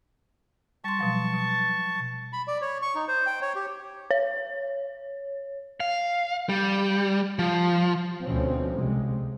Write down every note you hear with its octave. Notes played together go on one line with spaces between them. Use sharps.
G3 A5 C6 C#6
B2 F3 F#3
B2
B5
D5
C#5
C#6
D#4
C5
G5
C#5
G4
C#5
F5
G3
F3
D2 B2 F3 C4 C#4
C2 C3 G#3